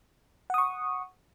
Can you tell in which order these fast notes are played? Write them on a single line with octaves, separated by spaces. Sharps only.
F#5 D#6 C#6